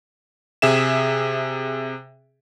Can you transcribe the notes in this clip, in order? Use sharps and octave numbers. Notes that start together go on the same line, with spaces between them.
C3 G#4 E5 E7